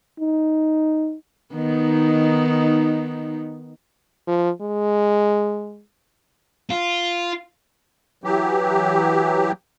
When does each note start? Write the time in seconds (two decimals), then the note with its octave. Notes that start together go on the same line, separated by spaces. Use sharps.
0.20 D#4
1.53 D#3 B3 D#4
4.27 F3
4.61 G#3
6.70 F4
8.24 E3 F#3 G4